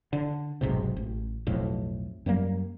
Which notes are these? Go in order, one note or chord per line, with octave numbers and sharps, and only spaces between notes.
D3
F1 B1 G#2 C3
A1
B1 F2 A2
F#2 F#3 G3 A#3